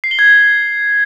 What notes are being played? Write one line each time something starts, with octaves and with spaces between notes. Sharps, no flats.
C7
G7
G#6